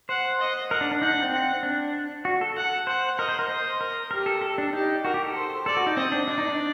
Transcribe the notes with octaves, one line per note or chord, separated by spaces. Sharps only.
C5 F#5
D#5
A#4 F#5
D4
D4
D#4 F#5
D4
C4
F#5
D4
F#4
A4
A4 F#5
C5 F#5
A#4 D#5
C5
A#4
C5 D#5
A#4
G4 A#4
A4
A4
D4
D#4 G4
F#4 A#4
G4
A4
C5
A4 D5
F#4
D#4
C4 D#5
D4
D4 D5
D#4
D4